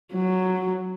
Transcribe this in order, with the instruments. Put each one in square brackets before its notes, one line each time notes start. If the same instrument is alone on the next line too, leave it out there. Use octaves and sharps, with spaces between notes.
[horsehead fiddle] F#3